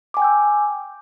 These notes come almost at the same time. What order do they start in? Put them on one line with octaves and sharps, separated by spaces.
D6 G#5 G5 G6 E6